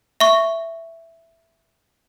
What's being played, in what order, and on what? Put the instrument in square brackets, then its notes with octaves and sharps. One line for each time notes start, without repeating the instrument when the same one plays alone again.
[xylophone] E5 C#6